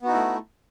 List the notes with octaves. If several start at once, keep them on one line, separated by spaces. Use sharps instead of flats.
A3 B3 D#4 E4 F#4